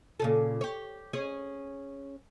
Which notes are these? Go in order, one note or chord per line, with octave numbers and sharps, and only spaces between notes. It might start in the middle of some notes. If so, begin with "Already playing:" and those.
A#2 C#3 A4
G4 C#5
C#4 G#4 C#5